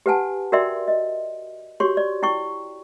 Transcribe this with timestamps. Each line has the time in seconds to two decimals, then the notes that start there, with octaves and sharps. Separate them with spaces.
0.06 G4 B4 F#5 G#5 A5
0.52 F#4 A#4 D5 E5 G5 C6
0.88 D#5
1.80 F#4 G4 C#5 C6 C#6
1.97 D5
2.23 E4 G5 C#6